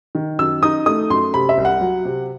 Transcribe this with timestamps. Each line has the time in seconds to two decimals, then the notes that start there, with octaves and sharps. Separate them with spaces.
0.15 D#3
0.39 F#2 E6
0.63 D#4 D#6
0.86 A3 D#6
1.10 F#2 C6
1.34 C3 B5
1.49 E5
1.58 C2
1.65 F#5
1.81 F#3
2.05 C3